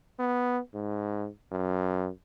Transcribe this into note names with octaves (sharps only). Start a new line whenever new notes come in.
B3
G#2
F#2